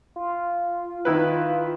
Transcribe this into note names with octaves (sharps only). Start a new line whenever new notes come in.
F4
D#3 E4 B4